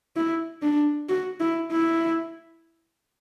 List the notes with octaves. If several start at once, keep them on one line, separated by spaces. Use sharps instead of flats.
E4
D4
F#4
E4
E4